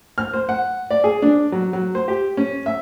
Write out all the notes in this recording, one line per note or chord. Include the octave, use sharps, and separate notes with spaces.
F6
C5
F#5
D5
G#4
D4
F#3
F#3
C5
G4
C#4
E5